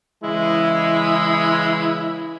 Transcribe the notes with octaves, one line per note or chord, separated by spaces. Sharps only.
C#3 E3 G#3 E4